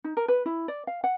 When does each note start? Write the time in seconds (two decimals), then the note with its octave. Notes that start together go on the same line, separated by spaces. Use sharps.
0.04 D#4
0.17 A#4
0.28 B4
0.46 E4
0.68 D5
0.87 F5
1.04 F#5